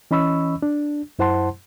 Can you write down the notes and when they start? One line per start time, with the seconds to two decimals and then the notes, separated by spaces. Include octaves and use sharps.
0.11 E3 C#4 D#5 B5 C#6 E6
0.62 D4
1.19 F#2 E4 C5 F#5 A5 C6